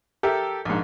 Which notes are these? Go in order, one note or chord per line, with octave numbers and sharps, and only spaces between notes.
G4 A4 A#4 E5
A#1 G#2